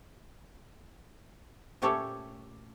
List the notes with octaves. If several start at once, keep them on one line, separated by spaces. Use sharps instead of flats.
A#2 A3 C#4 G4 A4 C#5